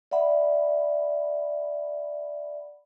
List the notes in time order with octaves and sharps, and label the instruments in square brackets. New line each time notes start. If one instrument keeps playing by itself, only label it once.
[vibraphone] D5 E5 F#5 B5